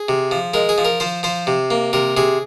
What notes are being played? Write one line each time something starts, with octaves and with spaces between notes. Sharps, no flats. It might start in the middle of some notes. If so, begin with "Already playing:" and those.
Already playing: G#4
C3
F3
G#3 A#4
G#4
F3
A#4
F3 C5
F3 C5
C3
A#3
C3 A#4
C3 G#4